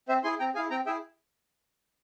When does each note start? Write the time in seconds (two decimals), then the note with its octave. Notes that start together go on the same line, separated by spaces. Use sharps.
0.09 C4 C5 E5
0.23 E4 G#4 G#5 C6
0.39 C4 G5 A#5
0.55 E4 G#4 F5 G#5
0.70 C4 G5 A#5
0.86 E4 G#4 E5 G5